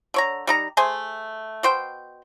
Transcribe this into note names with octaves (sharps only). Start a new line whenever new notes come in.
D3 C#5 A#5
G3 D#4 A#5
A3 G#4 C5 G#5
B2 C5 G5